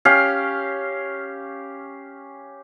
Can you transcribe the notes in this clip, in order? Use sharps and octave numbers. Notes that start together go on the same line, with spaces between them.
C#4 G4 F5